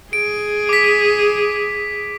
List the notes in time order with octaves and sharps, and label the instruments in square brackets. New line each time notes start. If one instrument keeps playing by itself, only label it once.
[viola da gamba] G#4 [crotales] D7
[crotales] D6 B6